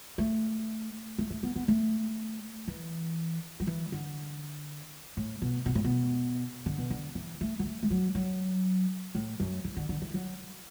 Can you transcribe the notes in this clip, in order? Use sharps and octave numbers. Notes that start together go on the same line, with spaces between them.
A3
A3
A3
B3
B3
A3
E3
F#3
E3
D3
A2
B2
B2
A2
B2
D3
B2
D3
E3
A3
F#3
A3
A3
F#3
F#3
A2
F#2
E3
D3
D3
E3
F#3